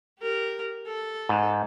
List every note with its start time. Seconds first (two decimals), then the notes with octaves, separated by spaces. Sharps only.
0.19 G4 A#4
0.86 A4
1.29 G#2